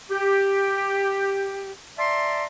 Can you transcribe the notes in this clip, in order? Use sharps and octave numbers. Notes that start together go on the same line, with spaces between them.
G4
D5 E5 A5 A#5 C6